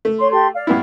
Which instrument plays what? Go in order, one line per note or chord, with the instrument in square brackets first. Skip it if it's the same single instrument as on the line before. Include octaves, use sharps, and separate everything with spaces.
[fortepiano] A3
[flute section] C#5 C6
G4 A4 C6
D5 F5
[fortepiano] G2 B3 E4